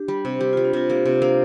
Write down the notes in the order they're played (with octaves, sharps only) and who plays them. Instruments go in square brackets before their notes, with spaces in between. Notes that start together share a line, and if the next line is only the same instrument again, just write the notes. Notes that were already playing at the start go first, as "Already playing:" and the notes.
Already playing: [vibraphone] D4 G4
[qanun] G3
C3
[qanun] G3 [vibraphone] G4
[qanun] G3 [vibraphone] F4
[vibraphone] D4
[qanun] C3 [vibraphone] F4
[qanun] A#3 [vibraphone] G4
[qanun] C3 [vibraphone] F4
[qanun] A#3 [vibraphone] D4